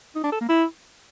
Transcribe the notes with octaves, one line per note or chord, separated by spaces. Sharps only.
D#4
D4
A4
A#3
E4